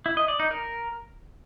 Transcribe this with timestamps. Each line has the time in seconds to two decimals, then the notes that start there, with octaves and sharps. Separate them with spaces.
0.06 E4
0.17 D#5
0.28 D5
0.40 D#4
0.51 A#4